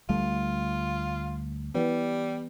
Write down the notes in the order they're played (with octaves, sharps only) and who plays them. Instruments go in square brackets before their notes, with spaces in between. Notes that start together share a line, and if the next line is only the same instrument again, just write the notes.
[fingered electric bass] D2 G3 A3 [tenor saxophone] F4
[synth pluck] E3 B3 [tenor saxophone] G3